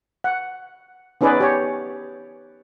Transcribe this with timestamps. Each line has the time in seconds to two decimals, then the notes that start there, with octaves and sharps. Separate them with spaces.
0.24 F#5
1.21 B3 C#4 D#4 G#4 B4 D5
1.40 G4 C#5